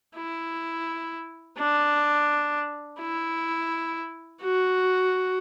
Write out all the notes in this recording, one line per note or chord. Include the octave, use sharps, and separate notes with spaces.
E4
D4
E4
F#4